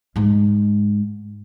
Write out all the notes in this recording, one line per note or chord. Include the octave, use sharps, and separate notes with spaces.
G#2 G#3